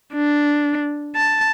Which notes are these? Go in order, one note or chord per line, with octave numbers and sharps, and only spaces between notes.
D4
A5